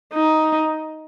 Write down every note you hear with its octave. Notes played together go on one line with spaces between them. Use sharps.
D#4